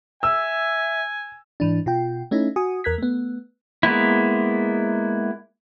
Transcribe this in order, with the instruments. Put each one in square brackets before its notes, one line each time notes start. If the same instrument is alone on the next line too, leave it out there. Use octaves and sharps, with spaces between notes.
[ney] E5 [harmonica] G#5 [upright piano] E6
[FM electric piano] G#2 E3 D4
B2 F4 G5
A3 C#4 D#4 E4
F#4 G#5 D#6
E2 A#4 F#6 G#6 B6
A3 B3
[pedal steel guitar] G#3 A#3 B3 E4